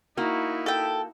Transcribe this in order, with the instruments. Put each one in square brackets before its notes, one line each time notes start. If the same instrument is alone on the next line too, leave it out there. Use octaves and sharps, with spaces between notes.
[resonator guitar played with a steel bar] A#3 F#4 [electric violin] D#4 E4
[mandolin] A4 G5